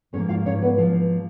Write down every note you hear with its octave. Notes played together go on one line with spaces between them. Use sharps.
G#2 F3 A#3 C#4 C#5
F4 F5
C#4 C#5
B3 B4
F3 F4